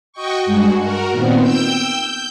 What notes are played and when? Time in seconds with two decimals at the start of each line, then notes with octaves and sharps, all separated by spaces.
0.12 F#4 D#5 G5 C#6
0.45 G2 G#3 F#4
0.79 F#4 A#4
1.10 A#2 D#3 B3 C4
1.41 G5 E6 G6
1.96 G6